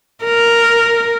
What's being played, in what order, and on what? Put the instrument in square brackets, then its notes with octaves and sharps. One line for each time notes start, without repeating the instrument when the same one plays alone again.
[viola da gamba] A#4